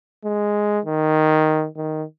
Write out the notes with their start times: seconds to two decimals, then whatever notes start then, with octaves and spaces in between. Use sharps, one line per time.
0.25 G#3
0.85 D#3
1.77 D#3